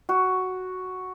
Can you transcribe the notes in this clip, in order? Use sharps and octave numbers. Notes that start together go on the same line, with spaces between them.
F#4